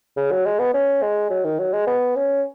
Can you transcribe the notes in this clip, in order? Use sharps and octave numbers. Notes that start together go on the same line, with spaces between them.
C#3
F#3
G#3
B3
C#4
G#3
F#3
D#3
F#3
G#3
B3
C#4